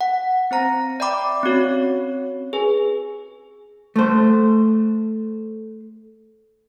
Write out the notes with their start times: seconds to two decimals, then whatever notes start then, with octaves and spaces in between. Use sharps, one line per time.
0.01 F#5
0.51 C4 C5 A#5 A#6
1.00 D5 E5 G5 B5 D6
1.43 C4 C#4 F#4 C#5
2.53 G#4 B4 G#5
3.96 A3 C5